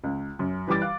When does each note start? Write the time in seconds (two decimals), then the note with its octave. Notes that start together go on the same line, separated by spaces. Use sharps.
0.03 C#2
0.39 F#2
0.67 E3 G3 G4 D6 A6
0.81 F5 F#6